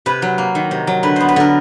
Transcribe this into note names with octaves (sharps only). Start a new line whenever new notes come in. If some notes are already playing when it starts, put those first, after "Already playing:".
C3 B4
F#3
A#3
D#3
C3
F#3
D3 B4
B3 C5
B4
D3 A#4